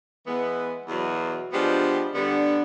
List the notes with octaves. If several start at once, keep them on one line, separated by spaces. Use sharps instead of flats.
E3 G#3 B3
E2 B2 F#3
F3 G#3 B3 D4 G4
D3 G3 B3 D4